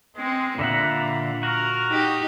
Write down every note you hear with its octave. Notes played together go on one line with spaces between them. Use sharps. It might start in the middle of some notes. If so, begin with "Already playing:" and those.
G#3 C4
A#2 D3 G3 E5 F#5 A#5
F#4 A#4 A#5
D#4 G4